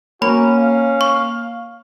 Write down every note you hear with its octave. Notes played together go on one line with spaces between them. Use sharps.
A#3 C#4 F#4 B5
F5
C#6